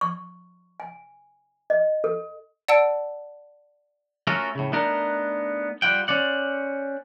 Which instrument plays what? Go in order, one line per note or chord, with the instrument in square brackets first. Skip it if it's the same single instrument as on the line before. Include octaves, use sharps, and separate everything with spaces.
[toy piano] C#6
G#5
D#5
A4
[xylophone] D5 F#5 A5 E6 D7
[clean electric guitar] A3 C#4 F4 F#4 A4 A#4
A2 C#3
A3 B3 D4 D#4 A#4
G3 F4 F#5 G5
C#4 C5 D5 F#5